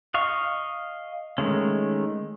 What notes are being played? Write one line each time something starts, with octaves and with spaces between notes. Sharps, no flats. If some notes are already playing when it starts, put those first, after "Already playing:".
D#5 F5 C#6
D#3 G#3 A3 C#4